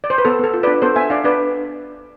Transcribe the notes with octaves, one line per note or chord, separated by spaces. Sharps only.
D5
C5
B4
B3 A4
B3 A4
F4
D4 B4 D5
B3 A4 C5
B3 E5 G#5
D4 D5 F5
D4 B4 D5